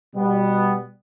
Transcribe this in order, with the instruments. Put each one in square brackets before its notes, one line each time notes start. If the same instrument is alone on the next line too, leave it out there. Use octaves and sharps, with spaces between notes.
[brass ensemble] B2 G3 B3